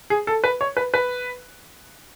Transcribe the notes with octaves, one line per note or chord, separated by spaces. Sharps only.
G#4
A4
B4
C#5
B4
B4